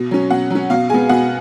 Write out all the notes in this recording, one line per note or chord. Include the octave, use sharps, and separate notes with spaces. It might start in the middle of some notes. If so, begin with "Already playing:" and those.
Already playing: B2
F#3 C#4
B2 F#5
F#3 C#4
B2 F5
G#3 B3 G#5
B2 F#5